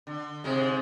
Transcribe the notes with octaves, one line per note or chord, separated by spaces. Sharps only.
D3
G#2 C3 G#3